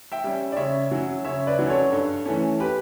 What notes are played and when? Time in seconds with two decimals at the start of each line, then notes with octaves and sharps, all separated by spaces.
0.12 E5 G5
0.24 G3 C#4
0.52 D5
0.57 C#3 C#5 E5
0.91 F#3 C#4
1.24 C#3 C#5 E5
1.47 B4 D5
1.59 F#3 C#4
1.69 A4 C#5
1.92 G2 A4
2.25 E3 A3 C#4
2.60 G4 B4